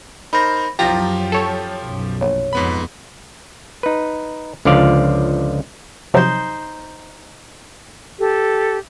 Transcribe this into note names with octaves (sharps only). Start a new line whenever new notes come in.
D#4 A#4 C5 B5 A#6
C2 F#2 F3 F#3 F4 G4 G5 A#5
A4 C#5
B1 F#2
A#1 C#5
F2 G#2 B3 B5
D#4 B4
C#2 D3 F3 D5 F5
C3 F3 F#3 D#4 C5
G4 A4